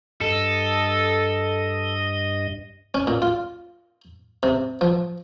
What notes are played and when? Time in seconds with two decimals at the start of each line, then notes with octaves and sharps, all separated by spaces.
0.21 G2 A4 D#5
2.94 C#4
3.07 A#2
3.22 F4
4.43 C3
4.81 F3